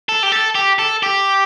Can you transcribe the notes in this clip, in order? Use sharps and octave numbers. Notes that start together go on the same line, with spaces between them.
A4
G4
A4
G4
A4
G4